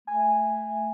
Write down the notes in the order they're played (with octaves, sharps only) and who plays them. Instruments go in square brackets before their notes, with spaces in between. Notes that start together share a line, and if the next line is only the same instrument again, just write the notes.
[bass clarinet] A3 [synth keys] G#5